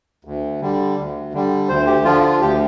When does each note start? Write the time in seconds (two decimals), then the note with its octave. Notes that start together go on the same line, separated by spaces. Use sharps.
0.25 D2
0.61 D3 G3
0.97 D2
1.33 D3 G3
1.69 D2 C5
1.86 G4
2.04 D3 F3 F4
2.23 F4
2.40 D2 G4